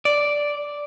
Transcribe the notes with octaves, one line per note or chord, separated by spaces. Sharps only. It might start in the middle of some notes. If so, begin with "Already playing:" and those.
D5